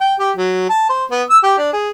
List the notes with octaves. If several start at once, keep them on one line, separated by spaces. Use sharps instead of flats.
G5
G4
F#3
A5
C5
B3
E6
G4
D4
G#4